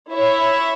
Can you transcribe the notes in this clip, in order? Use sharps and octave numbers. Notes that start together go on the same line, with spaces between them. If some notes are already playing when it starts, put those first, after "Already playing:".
E4 C#5 E5